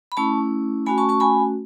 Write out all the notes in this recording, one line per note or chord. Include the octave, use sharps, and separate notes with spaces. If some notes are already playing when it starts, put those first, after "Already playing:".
B5
A3 C#4 E4 A5 C#6
A3 C#4 F#4 G#5 B5
A5 C#6
A5 C#6
G#5 B5